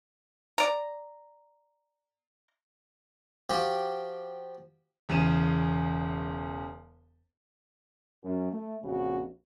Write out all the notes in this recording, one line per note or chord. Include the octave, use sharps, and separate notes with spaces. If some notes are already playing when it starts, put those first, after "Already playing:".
D5 A#5
F3 F#4 G4
E1 E2 C#3 D#7 E7
F#2
A3
A#1 F2 C#3 F#4